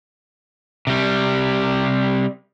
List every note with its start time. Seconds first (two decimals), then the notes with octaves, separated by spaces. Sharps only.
0.87 C3 G3